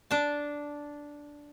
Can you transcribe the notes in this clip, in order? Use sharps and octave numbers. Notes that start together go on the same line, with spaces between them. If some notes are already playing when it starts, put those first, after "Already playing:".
D4 A5